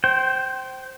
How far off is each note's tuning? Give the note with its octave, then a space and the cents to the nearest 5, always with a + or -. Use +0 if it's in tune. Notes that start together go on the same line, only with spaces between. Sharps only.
C5 +5 G5 -25